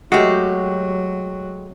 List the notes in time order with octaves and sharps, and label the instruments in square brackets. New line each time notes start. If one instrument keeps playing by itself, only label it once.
[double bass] F#3 [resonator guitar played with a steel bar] G#3 G4 [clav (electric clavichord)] A3 F#4